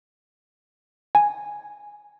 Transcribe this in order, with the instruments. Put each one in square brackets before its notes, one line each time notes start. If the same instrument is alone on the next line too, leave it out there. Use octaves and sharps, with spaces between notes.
[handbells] G#5